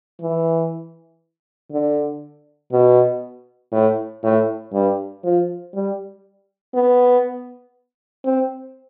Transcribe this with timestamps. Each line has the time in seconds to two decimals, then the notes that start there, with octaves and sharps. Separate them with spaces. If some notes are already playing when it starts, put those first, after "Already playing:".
0.21 E3
1.71 D3
2.72 B2
3.72 A2
4.23 A2
4.73 G2
5.24 F3
5.74 G3
6.74 B3
8.25 C4